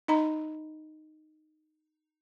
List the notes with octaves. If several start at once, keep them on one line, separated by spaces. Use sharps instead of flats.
D#4 D#5 A#5 B5